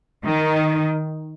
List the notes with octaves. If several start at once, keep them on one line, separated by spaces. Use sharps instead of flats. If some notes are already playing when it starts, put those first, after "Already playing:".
D#3